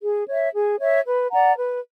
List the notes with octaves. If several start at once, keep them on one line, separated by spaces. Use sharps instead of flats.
G#4
C#5 E5
G#4
C#5 E5
B4
D5 F#5 A#5
B4